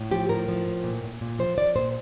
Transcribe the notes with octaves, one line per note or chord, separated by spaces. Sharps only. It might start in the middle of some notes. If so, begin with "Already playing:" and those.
Already playing: A2
F3 G4
A2 A#4
F3
A2
A#2
A#2
A#2
F3 C5
F3 D5
A#2 C5